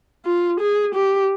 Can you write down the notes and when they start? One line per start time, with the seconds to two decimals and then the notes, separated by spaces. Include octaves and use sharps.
0.25 F4
0.60 G#4
0.95 G4